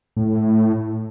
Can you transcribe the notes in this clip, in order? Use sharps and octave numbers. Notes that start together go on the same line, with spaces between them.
A2